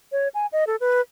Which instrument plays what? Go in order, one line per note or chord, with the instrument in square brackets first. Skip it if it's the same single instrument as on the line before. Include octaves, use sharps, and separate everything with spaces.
[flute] C#5
G#5
D#5
A4
B4